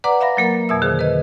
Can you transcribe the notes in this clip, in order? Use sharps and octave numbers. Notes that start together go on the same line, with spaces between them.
B4 D5 F#5 A#5 D6
E5 F5 B5 A#6
F#3 A#3 A#4
F2 B2 E5 E6
D3 D#3 G#4 C5
B4 D#5